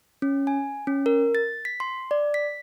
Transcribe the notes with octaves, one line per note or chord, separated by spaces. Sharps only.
C#4
G#5
C#4
A#4
A6
B6
C6
D5
B6